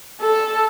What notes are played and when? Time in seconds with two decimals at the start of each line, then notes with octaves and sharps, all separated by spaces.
0.21 A4